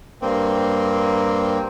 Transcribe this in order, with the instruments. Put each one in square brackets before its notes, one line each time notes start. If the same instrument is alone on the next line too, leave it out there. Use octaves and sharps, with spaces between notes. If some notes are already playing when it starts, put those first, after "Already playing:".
[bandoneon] G2 A#3 C4